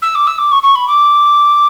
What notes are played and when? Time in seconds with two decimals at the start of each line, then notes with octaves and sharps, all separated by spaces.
0.02 E6
0.15 D6
0.27 E6
0.38 D6
0.51 C#6
0.63 C#6
0.75 B5
0.88 D6